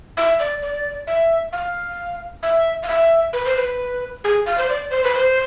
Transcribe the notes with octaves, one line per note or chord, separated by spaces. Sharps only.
E5
D5
D5
E5
F5
E5
F5
E5
B4
C5
B4
G#4
F5
C5
D5
C5
B4
C5